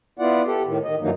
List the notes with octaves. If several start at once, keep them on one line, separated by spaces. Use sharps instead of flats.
B3 E4 F4 D5 F#5
G4 A4
A2 D#3
D#3 D#5
G2 D#3 E3 F#3 A#3 D#4